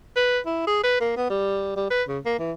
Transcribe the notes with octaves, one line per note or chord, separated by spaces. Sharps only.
B4
E4
G#4
B4
A#3
B3
G3
G3
B4
C#3
A#3
E3